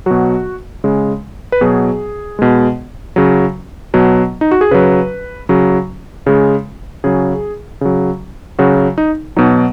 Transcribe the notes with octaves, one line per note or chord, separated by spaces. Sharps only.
B2 F#3 F#4
C#3 G#3
B4
B2 F#3 G#4
B2 G#3
C#3 F#3
B2 F#3
D#4
F#4
G#4
C#3 F#3 B4
C#3 F#3
C#3 G#3
C#3 F#3 G#4
C#3 F#3
C#3 F#3 F#4
D#4
B2 F#3 D#4